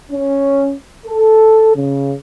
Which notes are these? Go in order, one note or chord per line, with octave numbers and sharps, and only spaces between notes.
C#4
A4
C#3